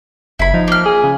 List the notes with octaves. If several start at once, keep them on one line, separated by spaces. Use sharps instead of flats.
F#1 E4 B5
F3 D#4
A#3 F6
G#4
C#3